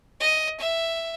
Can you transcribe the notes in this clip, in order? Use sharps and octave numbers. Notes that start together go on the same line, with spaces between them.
D#5
E5